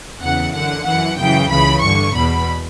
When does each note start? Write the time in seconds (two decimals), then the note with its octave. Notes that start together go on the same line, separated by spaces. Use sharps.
0.21 E2 C#3 E3 F#5
0.54 F#2 D3 F#5
0.86 F#2 E3 F#5
1.18 F#2 C#3 E3 G5
1.50 C#2 C#3 E3 B5
1.82 G2 D3 C#6
2.15 E2 B2 B5